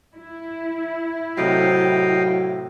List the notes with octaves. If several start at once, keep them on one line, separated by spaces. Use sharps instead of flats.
E4
A2 C3 F#3 D#5 F5 G5